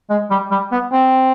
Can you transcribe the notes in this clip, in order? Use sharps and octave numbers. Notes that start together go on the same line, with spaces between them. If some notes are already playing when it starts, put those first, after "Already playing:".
G#3
G3
G3
B3
C4